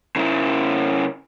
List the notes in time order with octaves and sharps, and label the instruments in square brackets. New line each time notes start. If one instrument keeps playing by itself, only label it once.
[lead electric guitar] C#3 E4